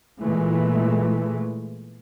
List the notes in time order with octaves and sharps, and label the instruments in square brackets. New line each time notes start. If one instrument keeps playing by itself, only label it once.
[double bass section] A#2 E3 G#3 A3